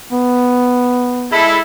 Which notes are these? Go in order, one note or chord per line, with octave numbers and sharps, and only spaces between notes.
B3
G#3 E4 A4